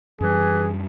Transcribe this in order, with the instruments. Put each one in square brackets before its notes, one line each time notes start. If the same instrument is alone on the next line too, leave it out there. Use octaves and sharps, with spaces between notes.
[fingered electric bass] F#2 G3 [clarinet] E3 [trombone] G#4